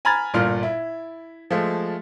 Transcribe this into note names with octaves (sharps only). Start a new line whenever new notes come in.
G#5 A#5 B5 F6 G#6 A6
G1 A#2 F4 F6
E4
F3 G#3 A3